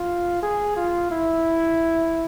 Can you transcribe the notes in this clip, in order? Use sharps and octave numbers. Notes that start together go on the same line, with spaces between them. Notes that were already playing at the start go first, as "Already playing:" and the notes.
Already playing: F4
G#4
F4
E4